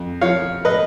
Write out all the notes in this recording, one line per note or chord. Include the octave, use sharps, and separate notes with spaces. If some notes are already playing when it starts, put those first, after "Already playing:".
Already playing: F2
F3 C#5 F5
B4 D#5